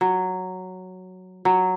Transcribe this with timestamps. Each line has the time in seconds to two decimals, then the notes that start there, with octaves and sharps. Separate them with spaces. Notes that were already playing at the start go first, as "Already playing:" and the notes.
0.01 F#3
1.45 F#3